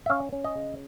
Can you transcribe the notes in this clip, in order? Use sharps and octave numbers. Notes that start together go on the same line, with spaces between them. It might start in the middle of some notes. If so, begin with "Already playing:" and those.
E5
C#4 F5
C#4
D#5
C#3